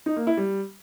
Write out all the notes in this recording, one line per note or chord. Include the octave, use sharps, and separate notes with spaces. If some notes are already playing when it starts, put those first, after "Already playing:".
D#4
A#3
E4
G3